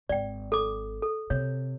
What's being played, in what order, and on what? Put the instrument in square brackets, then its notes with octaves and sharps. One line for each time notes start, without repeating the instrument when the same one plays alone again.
[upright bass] G#1 [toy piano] D5 G5
[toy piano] A4 D6
A4
[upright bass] C3 [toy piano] C#5